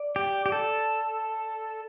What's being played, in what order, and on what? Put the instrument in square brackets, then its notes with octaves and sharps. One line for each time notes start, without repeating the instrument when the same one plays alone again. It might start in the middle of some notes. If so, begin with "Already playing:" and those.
Already playing: [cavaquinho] D5
[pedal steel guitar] G4
G4
A4